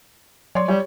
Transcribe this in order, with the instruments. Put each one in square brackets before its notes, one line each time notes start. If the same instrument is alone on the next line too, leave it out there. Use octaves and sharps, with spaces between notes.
[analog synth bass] F#3 [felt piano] C#5 D5 C6
[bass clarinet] G3 [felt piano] G4 C#5